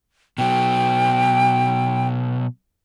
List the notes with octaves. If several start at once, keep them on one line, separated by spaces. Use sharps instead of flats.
B2 F#3 G5